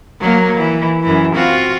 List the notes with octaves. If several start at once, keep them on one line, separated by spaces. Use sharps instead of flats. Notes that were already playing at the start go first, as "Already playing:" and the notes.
F#3 A#3
E3
F#2 E3
C4 F4 F#4